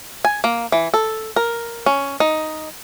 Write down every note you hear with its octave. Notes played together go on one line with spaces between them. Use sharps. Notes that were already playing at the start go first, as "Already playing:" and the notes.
G#5
A#3
E3
A4
A#4
C#4
D#4